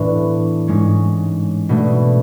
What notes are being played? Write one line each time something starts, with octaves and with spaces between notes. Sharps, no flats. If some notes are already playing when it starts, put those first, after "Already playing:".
Already playing: A2 E3 B3 D4
G#2 G#3 C#4
B2 A3 D4